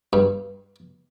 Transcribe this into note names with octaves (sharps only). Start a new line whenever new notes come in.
G2